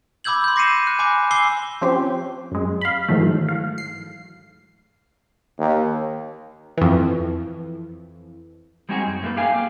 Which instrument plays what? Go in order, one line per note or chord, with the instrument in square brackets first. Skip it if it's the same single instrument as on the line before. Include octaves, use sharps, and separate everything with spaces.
[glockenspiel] B5 D6 E6 G6 G#6 F#7
C6 G6
D6 A#6 C7 C#7 D#7 E7
F#6
G#5 B5 D6
G#5 D6 E6 C7 G7
[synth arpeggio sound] F3 C4 C#4 G4
F#2 G#3
F5 B5
G#2 D#3 E3 F#3 A3
F5
C7
[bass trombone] D#2
[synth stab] F2 E3
[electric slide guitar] G3 G#3 C4 D#4 F#4 G#4
F#2
A3 A#3 D#4 E4 B4
A#3 G4 G#4 F5 G5 G#5
G4 F5